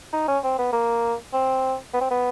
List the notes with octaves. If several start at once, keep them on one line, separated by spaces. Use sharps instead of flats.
D#4
C#4
C4
B3
A#3
C4
B3
C4
B3